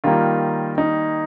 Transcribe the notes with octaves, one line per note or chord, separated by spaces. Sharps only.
D#3 G3 A#3 F4
D#4